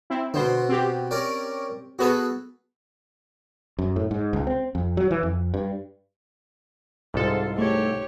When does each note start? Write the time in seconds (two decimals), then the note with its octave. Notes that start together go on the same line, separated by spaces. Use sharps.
0.10 C4 E4
0.34 B2 D3 B3 C5
0.69 C4 G4
1.11 C#4 A#4 D5
1.99 B3 F#4 G#4 A4 B4
3.79 F#2
3.96 A2
4.11 G#2
4.33 C#2
4.47 C4
4.75 F2
4.97 F#3
5.11 E3
5.23 F2
5.54 G2
7.14 C2 G#2 F4 A4
7.59 A3 G4 C#5